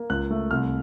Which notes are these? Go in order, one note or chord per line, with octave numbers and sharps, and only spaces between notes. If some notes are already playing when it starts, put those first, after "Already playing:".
Already playing: A#3
C#2 F#6
A3
C2 F6